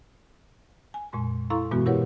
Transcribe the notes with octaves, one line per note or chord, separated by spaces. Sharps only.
G#5
F2 A#2 G#3 C6
E4 A4 F5 A#5 C6 C#6
G2 B2 E3 G#3 B3 F#4
E4 G4 A#4 B4 C#5 F#5